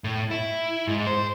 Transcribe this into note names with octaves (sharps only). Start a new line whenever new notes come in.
A2
E4
G#2
C5